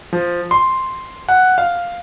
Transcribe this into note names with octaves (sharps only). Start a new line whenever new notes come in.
F3
C6
F#5
F5